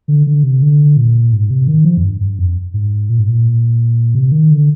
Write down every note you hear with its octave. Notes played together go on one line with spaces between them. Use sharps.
D3
D3
C3
D3
A#2
G#2
C3
D#3
F3
F2
G2
G2
F2
G#2
A#2
G#2
A#2
C3
D#3
D3